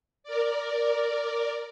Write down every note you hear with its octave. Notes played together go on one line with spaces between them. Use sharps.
A#4 D5